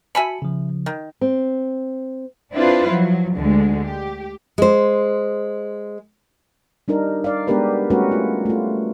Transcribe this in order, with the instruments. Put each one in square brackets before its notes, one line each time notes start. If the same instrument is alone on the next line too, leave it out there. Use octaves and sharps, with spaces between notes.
[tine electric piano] F#4 A5 C#7 [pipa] E5 G#5 B5
[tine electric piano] C#3 F3
[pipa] D#3
[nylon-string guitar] C4
[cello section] C4 D4 E4 F4 B4 C5
F3 F#3
D2 D3 G#3
G4
[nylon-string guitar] G#3 C5
[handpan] G3 D4 D#4 A#4
D5 F5
G#3 B3 D4 G4 A#4 B4
G3 A3 C#4 F#4 A#4 B4
F4
A3 F4